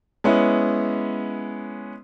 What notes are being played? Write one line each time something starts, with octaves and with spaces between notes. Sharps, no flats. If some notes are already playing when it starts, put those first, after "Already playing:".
G#3 B3 C#4 E4